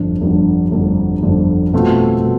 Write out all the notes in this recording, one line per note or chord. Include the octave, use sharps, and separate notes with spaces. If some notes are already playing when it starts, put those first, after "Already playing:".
Already playing: G1 F2 D3
G1 F2 D3
G1 F2 D3
G1 F2 D3
B2 A3 C4 F4
B2